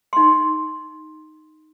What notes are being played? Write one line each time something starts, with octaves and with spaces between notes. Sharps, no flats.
D#4 C6